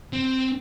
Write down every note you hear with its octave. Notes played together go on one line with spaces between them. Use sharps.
C4